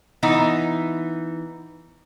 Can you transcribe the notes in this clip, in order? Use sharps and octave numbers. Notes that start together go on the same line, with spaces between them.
E3 B3 D#4